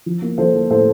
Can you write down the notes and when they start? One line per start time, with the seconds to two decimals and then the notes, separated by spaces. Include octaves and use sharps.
0.06 F3
0.22 A#3
0.38 F3 A4 C5
0.54 A#3
0.70 A2 A4 C5